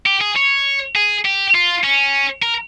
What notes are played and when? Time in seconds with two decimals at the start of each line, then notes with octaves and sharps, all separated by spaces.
0.06 G4
0.21 G#4
0.37 C#5
0.96 G#4
1.25 G4
1.54 F4
1.84 C#4
2.42 A#4